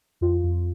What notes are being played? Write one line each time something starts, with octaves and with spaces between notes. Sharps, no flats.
F2 F4
F2